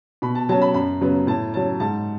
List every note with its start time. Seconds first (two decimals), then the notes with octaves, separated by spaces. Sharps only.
0.22 B2 B5
0.35 A5
0.49 F#3 C#4 A5
0.61 B5
0.74 F#2 B5
1.01 C#3 F#3 B3
1.27 A2 A5
1.54 F#3 C#4 A5
1.80 G#2 A5